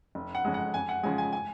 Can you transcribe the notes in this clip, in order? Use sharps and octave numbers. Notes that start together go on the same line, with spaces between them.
F1
F#5
F2 C#3 G#3
F#5
F2 G#5
F#5
C#3 F3 G#3 G#5
G#5
G#5